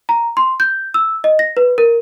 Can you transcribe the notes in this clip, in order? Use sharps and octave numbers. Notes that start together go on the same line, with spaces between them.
A#5
C6
G6
E6
D#5
A#6
B4
A#4